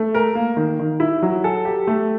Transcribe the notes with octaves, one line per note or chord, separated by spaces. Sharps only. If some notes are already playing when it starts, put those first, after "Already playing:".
Already playing: A3
A#4
A#3
D#3
D#3
E4
F#3
A4
G4
A3